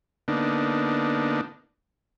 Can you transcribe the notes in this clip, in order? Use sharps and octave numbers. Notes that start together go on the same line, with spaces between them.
D3 A#3 B3 D4 D#4